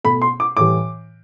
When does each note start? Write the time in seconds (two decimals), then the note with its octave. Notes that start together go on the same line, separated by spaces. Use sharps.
0.04 B2 A3 B5
0.22 C6
0.40 D6
0.57 A2 E3 G3 D6